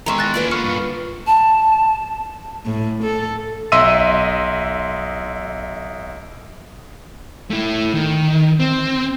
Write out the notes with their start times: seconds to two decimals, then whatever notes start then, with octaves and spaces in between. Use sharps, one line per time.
0.06 E2 D#3 G#3 E5 A#5 C6 C#6
0.18 F#6 A6 A#6
0.34 A#3 C#4 F4 B4 D5
0.51 D3 C#6 F6 C#7
0.64 G2
1.27 A5
2.65 A2
3.03 A4
3.72 B1 D#5 E5 C6 E6 D#7
7.51 A3 E4
7.94 D#3
8.60 C4